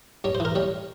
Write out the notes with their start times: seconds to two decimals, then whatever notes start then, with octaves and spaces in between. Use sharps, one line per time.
0.24 G2 C#5
0.35 C5
0.40 E3 A#4
0.55 G3 C#5